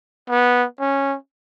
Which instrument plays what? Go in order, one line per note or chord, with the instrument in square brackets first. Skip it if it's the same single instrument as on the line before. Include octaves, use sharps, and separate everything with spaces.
[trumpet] B3
C#4